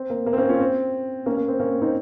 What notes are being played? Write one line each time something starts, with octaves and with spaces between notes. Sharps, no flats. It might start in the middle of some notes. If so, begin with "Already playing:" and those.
Already playing: C4
A#3
A#3
C4
A#3 C#4
C#4 F4
C4
A#3 C#4
A#3
C4
A#3 C#4
C4 D#4